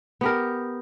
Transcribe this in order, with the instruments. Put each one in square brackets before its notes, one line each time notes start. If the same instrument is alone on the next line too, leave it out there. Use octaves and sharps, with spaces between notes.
[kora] B3 G4 A#4